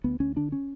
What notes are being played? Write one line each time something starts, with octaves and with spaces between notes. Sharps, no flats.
D2 B3
D2 C#4
D3 D4
C#4